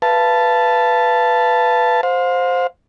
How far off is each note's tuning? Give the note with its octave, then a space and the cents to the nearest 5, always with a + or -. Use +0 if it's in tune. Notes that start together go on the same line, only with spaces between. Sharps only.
B4 +0 F5 -35 A5 +0
C5 +0 F5 +35